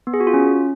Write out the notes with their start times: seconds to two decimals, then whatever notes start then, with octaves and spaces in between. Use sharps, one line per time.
0.07 B3
0.14 G#4
0.20 F#4
0.27 F4
0.34 C#4